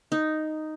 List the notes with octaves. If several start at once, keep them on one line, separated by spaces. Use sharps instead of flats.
D#4